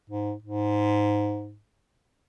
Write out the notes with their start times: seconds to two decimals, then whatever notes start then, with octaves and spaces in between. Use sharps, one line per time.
0.10 G#2
0.42 G#2